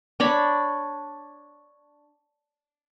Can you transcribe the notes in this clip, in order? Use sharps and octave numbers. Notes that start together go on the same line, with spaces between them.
D4 C#5 B5